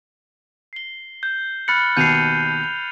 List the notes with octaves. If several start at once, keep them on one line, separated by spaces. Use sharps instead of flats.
C7 G7
G6
B5 F6 F#6 A6 C#7 F#7
D#2 B2 G6 C7 C#7 D#7 F7